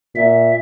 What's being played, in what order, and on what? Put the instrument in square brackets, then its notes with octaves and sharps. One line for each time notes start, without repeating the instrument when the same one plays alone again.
[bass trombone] A#2 [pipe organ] E5